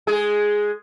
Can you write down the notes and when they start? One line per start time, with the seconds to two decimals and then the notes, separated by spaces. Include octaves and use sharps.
0.07 G#3 G#4